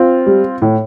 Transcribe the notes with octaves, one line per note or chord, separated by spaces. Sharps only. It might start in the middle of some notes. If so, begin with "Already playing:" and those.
Already playing: C4 F4
G3
A2